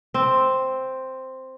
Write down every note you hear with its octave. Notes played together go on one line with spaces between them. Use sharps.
C4